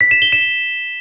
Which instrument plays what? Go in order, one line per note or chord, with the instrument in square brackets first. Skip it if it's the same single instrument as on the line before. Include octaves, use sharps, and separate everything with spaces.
[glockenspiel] B6
E7
G7
E7